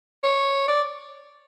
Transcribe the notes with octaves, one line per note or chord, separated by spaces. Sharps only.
C#5
D5